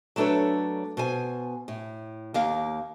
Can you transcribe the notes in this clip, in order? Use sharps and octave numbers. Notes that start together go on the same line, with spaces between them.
F#3 A3 D4 A4 B4 C#5
B2 C5 G#5
A2
D#2 A#3 F5